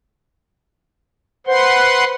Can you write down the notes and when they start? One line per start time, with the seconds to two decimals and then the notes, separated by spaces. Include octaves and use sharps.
1.47 B4 C5 F#5 C6